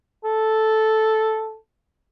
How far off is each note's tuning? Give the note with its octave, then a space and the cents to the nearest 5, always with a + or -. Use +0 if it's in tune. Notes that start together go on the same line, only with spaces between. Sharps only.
A4 -5